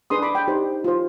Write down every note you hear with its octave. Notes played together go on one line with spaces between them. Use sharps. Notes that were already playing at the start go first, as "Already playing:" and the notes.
D4 G#4 B4 C6 D#6
B5 D6
G5 B5
D#4 G4 C5
F4 C5